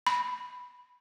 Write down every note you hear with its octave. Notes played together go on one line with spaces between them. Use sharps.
B5